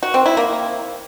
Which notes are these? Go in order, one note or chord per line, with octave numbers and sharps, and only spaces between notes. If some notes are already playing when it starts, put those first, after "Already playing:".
F#4
C4
E4
A#3